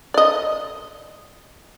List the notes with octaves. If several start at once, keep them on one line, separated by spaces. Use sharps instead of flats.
D5 D#5